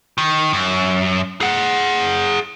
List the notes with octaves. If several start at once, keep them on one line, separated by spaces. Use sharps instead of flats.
D#3
F#2
G#4 F#5